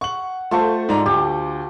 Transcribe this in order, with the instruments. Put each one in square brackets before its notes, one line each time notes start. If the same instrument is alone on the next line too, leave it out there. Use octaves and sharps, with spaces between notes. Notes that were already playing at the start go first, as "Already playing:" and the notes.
[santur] F#5 [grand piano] C#6 F#7
[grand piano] A3 C5 [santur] F4 A4 C#6
[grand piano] G#2 D5 A#5
[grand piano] D2 [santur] G4